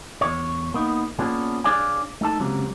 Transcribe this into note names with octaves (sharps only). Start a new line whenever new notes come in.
E2 C#5
A#3 B3 D#4
A#3 B3 C#4 D4 F4 G#4
D4 G#4 C#5 D5 F5 G#5
A3 D#4 A4 A5
C#2 C3 F#3 A#3